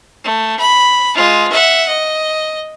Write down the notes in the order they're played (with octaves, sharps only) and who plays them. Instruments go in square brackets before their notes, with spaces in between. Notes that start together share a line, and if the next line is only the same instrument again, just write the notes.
[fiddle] A3
B5
G#3 F4
E5 F#5
D#5